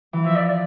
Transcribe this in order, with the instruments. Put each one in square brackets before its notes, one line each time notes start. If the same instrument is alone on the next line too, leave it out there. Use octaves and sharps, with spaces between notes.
[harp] E3
[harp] F3 [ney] E5
[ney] D5
D5